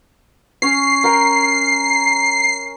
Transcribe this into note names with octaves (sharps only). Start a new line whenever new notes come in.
C#4 C#5 C7
A#4 G5